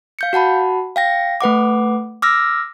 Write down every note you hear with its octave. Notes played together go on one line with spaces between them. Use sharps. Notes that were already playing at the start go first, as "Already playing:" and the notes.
F5 G6 C#7
F#4 F#5 A5 B5
F5 G5 A#6
A3 B4 F#5 D6
D6 E6 F6 A#6